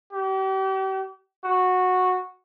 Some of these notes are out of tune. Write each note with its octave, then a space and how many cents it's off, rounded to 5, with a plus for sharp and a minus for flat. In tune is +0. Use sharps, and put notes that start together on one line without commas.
G4 -40
F#4 -10